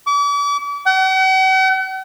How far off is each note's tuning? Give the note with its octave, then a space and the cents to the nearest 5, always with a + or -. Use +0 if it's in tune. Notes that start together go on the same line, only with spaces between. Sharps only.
D6 -40
F#5 +45